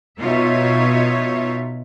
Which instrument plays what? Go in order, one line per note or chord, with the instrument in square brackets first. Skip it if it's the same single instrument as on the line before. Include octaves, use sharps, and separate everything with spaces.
[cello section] B2 D#4 F4 C#5 E5